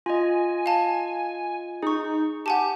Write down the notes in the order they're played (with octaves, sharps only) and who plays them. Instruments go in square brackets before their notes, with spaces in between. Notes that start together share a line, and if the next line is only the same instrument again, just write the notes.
[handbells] F4 D#5 [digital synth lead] G#5
[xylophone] F5 A5
[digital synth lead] D#4 [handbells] G#4 C#6
[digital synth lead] G4 [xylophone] F#5 G#5 A5